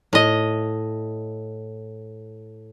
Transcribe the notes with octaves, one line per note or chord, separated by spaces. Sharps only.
A2 D#5